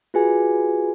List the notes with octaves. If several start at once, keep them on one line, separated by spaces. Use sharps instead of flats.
F4 F#4 G#4 B4 G#5